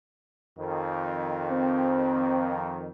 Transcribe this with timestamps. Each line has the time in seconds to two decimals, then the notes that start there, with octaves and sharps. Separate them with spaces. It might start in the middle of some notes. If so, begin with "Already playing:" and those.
0.58 F2 D#3
1.51 C4